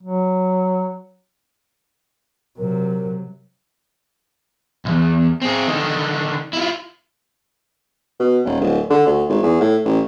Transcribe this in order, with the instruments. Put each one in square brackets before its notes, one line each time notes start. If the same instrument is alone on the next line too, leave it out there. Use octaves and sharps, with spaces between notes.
[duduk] F#3
[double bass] C3 F#3 [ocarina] A#4
[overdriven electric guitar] B1 E2
C4 G#4
D3 D#3
E4 F4
[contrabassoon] B2
D#1
D1
D3
D2
G#1
E2
A2
A1